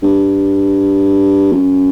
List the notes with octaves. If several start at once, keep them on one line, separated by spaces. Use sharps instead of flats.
G2
F#2